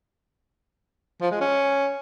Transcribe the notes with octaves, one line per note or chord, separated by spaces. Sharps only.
F3
G#3
C#4